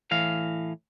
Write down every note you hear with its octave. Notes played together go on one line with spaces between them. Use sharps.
A2 E3 F5